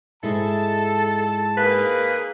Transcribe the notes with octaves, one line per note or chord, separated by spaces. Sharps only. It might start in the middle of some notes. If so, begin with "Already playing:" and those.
G#2 G#3 E4 A4 A5
A#3 C4 D#4 G#4 B4